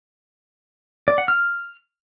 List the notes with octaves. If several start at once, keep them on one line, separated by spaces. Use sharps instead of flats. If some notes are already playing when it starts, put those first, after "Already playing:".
D5
F#5
F6